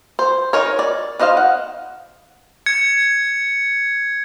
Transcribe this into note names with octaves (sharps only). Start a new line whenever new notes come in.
C5
D#4 A#4 C#5
D5
D4 D#4 C5 D#5 F5
F#5
G#6 C#7